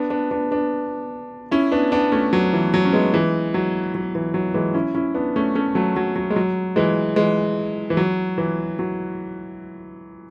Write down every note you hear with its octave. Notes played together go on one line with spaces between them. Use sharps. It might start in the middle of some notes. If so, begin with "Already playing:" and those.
Already playing: B3 D4
B3 D4
B3 D4
B3 D4
C#4 E4
B3 D4
B3 D4
A3 C#4
F#3
E3
F#3
C#4
G#3 B3
E3 G#3
F#3
F#3
E3
F#3
E3 G#3
C#4 E4
C#4 E4
B3 D4
A3 C#4
A3 C#4
F#3 A3
F#3
F#3
G#3
F#3
E3 G#3
E3 G#3
E3
F#3
E3
F#3